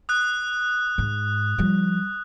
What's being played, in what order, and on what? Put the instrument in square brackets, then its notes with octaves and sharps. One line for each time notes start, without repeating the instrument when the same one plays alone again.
[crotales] D#6 F#6
[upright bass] G#2
F3 G3